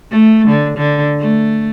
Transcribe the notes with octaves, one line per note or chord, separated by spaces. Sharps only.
A3
D3
D3
A3